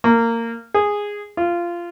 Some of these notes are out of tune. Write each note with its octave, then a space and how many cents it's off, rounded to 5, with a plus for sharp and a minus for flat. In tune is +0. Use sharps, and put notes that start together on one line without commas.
A#3 -20
G#4 -10
F4 -15